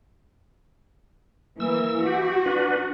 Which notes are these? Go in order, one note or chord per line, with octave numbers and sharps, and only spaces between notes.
E3 A#3 E6
F#4 G4
D4 B4